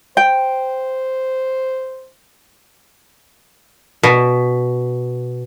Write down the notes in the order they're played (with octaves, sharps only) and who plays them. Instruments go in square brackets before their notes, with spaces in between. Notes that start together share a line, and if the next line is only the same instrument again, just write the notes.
[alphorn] C5 [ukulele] G5
[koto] B2